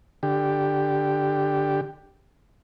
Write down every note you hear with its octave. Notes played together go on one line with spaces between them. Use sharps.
D3 G4